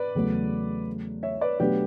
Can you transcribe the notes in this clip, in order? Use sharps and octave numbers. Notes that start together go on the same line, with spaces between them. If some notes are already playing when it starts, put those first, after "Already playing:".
Already playing: B4 D5
E2 C#3 F#3 A3
C#5 E5
B4 D5
B2 F#3 A3 D4 G4 B4